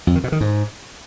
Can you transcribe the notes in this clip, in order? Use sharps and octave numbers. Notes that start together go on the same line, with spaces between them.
F2
D#3
B2
D#3
G#2